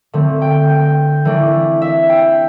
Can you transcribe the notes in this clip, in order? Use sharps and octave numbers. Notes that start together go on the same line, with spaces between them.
D3 A3 C4
G5
G5
E3 A3 D4
E5
G5